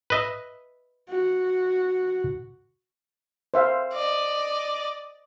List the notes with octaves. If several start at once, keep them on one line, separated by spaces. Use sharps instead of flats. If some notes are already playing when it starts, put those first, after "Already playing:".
B4 D#5 E5
F#4
C5 E5 F5
D5 D#5